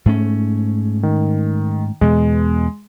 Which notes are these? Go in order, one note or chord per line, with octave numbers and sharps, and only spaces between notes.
G#2 A3 C#4
D#3
E2 B2 G#3